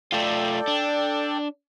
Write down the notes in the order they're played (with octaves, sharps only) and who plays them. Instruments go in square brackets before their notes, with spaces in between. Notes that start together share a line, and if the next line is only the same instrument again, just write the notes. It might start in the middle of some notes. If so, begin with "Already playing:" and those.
[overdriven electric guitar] A3 F4 [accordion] A4 D5 G5
[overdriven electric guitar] D4